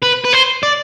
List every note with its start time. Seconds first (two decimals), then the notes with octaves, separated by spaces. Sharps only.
0.02 B4
0.24 B4
0.33 C5
0.63 D5